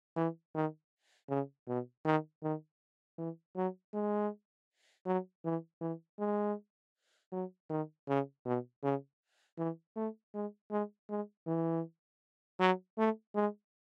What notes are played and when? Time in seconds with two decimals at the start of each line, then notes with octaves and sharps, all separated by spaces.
0.16 E3
0.55 D#3
1.29 C#3
1.68 B2
2.05 D#3
2.43 D#3
3.18 E3
3.56 F#3
3.94 G#3
5.06 F#3
5.45 E3
5.81 E3
6.19 G#3
7.32 F#3
7.70 D#3
8.08 C#3
8.46 B2
8.83 C#3
9.58 E3
9.96 A3
10.34 G#3
10.71 G#3
11.10 G#3
11.47 E3
12.60 F#3
12.98 A3
13.35 G#3